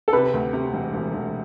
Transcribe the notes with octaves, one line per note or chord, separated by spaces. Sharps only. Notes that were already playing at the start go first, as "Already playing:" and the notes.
A4
C3 B4
D2
C3
E1
E1
E1